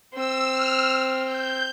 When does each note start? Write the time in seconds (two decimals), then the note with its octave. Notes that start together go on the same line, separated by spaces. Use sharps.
0.14 C4 E6
0.52 F6
1.26 G6